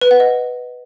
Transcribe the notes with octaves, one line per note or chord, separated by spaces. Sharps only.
B4
F#5
D#5